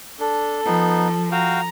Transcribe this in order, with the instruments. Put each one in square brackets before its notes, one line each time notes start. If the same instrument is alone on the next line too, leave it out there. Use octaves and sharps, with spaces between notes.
[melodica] D4 [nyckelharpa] A4
[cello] F3 [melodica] B3 D#4
[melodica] F#4 F5 G5 [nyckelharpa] A#5